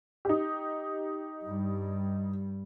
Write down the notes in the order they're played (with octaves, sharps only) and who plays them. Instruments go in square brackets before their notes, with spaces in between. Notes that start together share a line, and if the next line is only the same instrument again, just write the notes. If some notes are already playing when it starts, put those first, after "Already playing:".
[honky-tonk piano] D#4 G4
[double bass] G2 G3